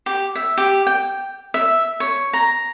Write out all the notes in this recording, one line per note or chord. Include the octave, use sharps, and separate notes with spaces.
G4
E5
G4
G5
E5
C#5
A#5